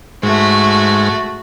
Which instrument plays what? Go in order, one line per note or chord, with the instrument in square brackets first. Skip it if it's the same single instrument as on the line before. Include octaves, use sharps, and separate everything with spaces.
[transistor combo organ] G#2 [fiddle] A3 F#4